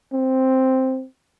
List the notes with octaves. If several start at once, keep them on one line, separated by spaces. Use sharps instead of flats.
C4